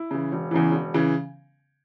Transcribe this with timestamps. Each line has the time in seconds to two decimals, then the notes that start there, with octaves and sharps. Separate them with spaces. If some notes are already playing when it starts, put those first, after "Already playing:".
Already playing: E4
0.11 C#3 E3
0.32 E1
0.51 E2 C#3 E3
0.72 E1
0.94 C#3 E3